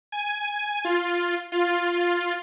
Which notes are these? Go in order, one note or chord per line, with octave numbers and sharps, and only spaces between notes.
G#5
F4
F4